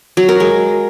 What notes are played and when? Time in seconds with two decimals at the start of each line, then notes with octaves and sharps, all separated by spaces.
0.17 F#3
0.29 A#4
0.40 G#3